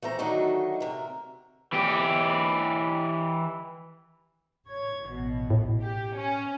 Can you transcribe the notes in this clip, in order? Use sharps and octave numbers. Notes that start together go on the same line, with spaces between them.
E3 A3 C4 A#5
D3 D#3 F#3 A3 D#4 F#4
C3 A#4
E3 G4
C#5 G#6
A1 B2
A2
G4
C#4